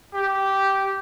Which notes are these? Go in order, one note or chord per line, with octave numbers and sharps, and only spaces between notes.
G4